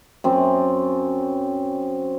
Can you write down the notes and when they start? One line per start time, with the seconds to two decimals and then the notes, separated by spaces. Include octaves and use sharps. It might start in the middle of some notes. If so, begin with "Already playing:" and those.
0.24 F#2 C4